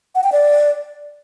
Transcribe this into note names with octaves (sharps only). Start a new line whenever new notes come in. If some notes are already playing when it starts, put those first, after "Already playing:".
F#5
G5
D5